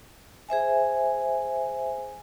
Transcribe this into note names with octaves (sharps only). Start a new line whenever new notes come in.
G#4 C5 E5 G#5